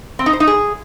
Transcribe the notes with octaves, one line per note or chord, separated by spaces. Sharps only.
C4
D#4
C5
D#4
G#4